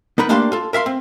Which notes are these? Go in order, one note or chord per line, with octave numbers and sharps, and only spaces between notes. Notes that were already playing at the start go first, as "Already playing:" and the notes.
B3 D#4 A#4 B4
A3 A#3 D4 G4 F5 C6
F4 A4
A#4 E5 F5 C6
C4